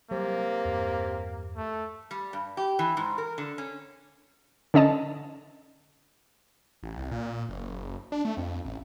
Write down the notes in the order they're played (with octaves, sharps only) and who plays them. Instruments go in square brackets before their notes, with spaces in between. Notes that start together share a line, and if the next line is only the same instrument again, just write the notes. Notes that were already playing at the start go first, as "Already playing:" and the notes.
[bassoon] C3 [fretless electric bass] F#3 G3 [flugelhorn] A#3
[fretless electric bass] E2 G2
[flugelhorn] A3
[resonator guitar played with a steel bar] G3
G2
G4
E3
G#2
A#4
D3
C#4
[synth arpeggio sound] D3 C#4 D#5 A5
[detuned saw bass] A1
C2
A#2
F#1
D4
A3
F2
A1